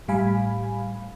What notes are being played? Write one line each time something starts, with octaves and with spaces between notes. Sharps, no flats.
A2 G3 F5 G#5 B5